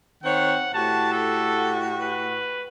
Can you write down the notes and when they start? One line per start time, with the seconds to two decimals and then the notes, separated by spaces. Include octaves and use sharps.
0.24 D#3 C4 C#5 F#5
0.74 A2 F#4 G4 A5
1.12 A4
2.01 B4